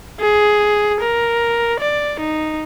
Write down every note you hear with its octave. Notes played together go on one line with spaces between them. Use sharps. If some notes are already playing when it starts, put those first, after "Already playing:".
G#4
A#4
D5
D#4